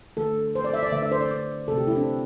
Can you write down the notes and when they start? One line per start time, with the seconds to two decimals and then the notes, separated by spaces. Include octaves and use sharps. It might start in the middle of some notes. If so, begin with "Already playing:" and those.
0.17 D3 A3 A4
0.55 C5
0.65 D5
0.73 E5
0.83 D5
0.92 D3 A3 E5
1.03 E5
1.12 C5
1.21 D5
1.31 D5
1.68 C3 A3 A4
1.78 G4
1.87 E4
1.92 C4
1.96 D4